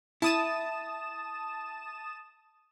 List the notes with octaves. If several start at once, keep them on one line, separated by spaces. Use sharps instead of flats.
E4 A5 D#6 E7